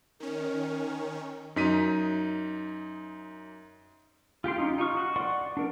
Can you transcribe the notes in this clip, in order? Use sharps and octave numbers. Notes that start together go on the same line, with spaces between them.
D#3 C#4 A#4
F#2 D#4 B6 D#7
F4 G4 G5 C6
C#4 D#4 F4
D#4 F4 C#6 F6
F#4
D5 F#5 C6 C#6
D4 A#4